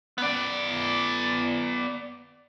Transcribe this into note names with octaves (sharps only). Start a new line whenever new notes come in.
B3 D5